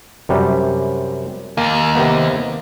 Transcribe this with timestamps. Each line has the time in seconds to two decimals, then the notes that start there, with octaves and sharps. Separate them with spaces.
0.29 F#2 C3 G3
1.57 D#2 A#3
1.95 C3 A#3 B3